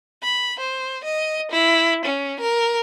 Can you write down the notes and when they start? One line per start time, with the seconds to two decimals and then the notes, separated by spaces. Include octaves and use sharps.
0.23 B5
0.60 C5
1.04 D#5
1.51 E4
2.05 C#4
2.40 A#4